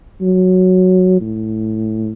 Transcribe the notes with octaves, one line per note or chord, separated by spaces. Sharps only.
F#3
A2